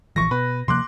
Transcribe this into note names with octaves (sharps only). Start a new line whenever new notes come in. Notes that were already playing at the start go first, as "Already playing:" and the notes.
A#1 E3 F3 C#6 A#6
B2 B4
C3 F3 A#3 C6 D6 F#6